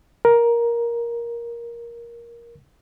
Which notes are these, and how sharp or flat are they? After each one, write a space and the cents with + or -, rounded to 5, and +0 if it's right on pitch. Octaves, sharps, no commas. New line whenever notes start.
A#4 +10